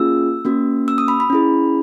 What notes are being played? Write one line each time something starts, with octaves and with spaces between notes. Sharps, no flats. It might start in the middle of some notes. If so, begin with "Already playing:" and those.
Already playing: A#3 C#4 F4 G#4 E6
A#3 C#4 F#4
E6
D#6
B5
B5
C#4 E4 G#4